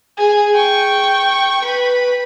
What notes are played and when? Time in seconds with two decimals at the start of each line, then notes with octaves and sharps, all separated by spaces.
0.17 G#4
0.55 G5 C#6
1.65 B4 B5